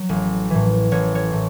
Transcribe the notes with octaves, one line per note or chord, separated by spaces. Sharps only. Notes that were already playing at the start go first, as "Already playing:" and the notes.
Already playing: F#3
A1
A2 E3
A1 C#5
C#5
A2